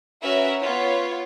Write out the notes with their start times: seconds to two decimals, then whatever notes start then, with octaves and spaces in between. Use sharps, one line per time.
0.23 C#4 F#4 A#4 B4 E5
0.61 B3 F4 C#5